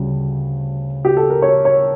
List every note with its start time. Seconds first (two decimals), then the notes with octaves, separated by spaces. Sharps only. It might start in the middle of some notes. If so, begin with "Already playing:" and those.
Already playing: D2 C#3 G3
1.05 G4
1.17 A4
1.30 A#4
1.42 C#5
1.65 C#5